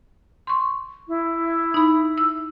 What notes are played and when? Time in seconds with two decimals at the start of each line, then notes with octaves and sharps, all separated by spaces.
0.47 C6 C#6
1.08 E4
1.74 D#4 B5
2.18 E6